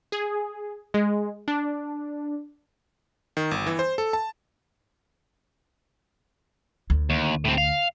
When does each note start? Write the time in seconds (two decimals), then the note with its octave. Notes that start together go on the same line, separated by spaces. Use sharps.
0.12 G#4
0.94 G#3
1.48 D4
3.37 D#3
3.51 G1
3.67 E3
3.79 C5
3.98 A4
4.13 A5
6.90 D2
7.10 D#2
7.45 A2 C4
7.58 F5